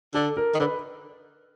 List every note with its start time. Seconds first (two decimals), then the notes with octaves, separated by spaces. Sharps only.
0.15 D3 A4
0.37 A#4
0.55 D#3
0.59 D3 B4